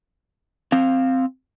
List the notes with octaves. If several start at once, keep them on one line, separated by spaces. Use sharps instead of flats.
C4 F5